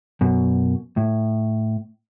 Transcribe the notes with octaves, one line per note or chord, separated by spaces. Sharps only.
F#2 B2
A2